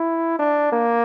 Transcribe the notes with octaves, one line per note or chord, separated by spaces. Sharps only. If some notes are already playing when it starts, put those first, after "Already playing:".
Already playing: E4
D4
A#3